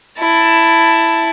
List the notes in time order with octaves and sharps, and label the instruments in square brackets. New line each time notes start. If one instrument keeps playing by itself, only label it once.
[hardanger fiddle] E4 A5